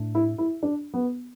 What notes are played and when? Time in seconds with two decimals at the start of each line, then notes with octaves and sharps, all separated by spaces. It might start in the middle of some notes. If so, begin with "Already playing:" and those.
Already playing: A2 A3 D4
0.15 E4
0.38 E4
0.63 D4
0.94 B3